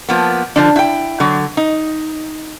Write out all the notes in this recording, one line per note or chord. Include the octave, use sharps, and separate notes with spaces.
F3 A#3 B3
D3 F3 D4
E4 G5
D3 F#3
D#4